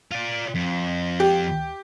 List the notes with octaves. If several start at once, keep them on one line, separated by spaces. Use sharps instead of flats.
F4 D5
F2
G4